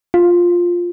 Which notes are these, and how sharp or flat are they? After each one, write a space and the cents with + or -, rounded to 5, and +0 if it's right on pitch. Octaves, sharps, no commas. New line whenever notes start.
F4 +5